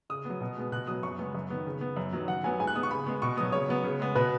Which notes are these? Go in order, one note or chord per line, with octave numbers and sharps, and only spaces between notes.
C#3 D#6
F#3 B3
B2
G#3 B3
B2 F#6
F#3 B3 D#6
F#2 C#6
C#3 G#3 B3
F#2
D#3 B3
C#3
B3
F#2
D#3 F#3 B3
F#2 F#5
F#3 B3 G#5
G#2 G#5
F#6
G#3 B3 D#6
C#6
C#3 B5
G#3 B3
B2 C#6
F#3 B3 D#6
C#3 C#5
F#3 B3
C#3
G#3 B3
B2 B4